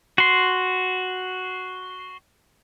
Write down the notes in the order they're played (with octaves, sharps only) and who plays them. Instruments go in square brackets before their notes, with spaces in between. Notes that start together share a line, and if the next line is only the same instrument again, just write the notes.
[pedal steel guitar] F#4 C6